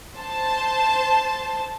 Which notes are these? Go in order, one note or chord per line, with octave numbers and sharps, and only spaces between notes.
C5 A5